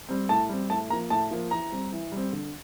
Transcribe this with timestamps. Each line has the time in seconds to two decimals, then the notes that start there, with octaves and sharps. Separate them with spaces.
0.09 G3 C4
0.29 A2 A5
0.49 G3 C4
0.70 A2 A5
0.90 A#3 A#5
0.93 F3
1.10 A2 A5
1.31 F3 A#3
1.51 E3 A#5
1.72 G3 C4
1.92 E3
2.12 G3 C4
2.33 D3